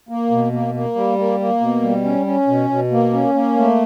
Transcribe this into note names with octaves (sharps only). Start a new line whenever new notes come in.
A#3
B2
A#3
A#3
G3
A#3
A#3
B2
G3
C#4
C#4
B2
B2
A#3
C#4
A#3
A3